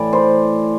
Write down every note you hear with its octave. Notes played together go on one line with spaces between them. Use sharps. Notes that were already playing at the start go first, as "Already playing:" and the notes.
Already playing: A2 E3 D5
C5